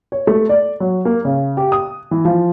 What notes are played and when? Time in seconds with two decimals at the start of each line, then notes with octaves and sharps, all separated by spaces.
0.12 C#5
0.27 A3
0.49 D5
0.80 F#3
1.05 A#3
1.25 C#3
1.57 G4
1.72 D#6
2.11 E3
2.25 F3